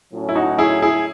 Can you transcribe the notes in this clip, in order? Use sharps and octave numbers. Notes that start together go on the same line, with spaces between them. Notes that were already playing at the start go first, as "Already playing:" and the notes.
A2 F#3 C#4
E4
D#4 F#4
E4 G#4
E4 G#4